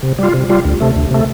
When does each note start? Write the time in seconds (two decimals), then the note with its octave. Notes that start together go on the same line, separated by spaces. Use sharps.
0.03 C3
0.19 G3 F4
0.34 C3
0.49 G3 F4
0.65 D2
0.80 C3 A3
0.96 D2
1.11 C3 A3